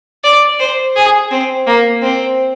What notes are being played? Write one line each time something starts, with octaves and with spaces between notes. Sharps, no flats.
D5
C5
G#4
C4
A#3
C4